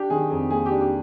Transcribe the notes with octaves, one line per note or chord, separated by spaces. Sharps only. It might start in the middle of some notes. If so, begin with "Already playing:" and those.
Already playing: D4 G4
D#3 G#4
F2 G#4
A#3 G#4
G4
D4
G4